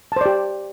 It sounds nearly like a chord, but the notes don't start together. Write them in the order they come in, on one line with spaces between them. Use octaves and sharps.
A5 C5 D5 G4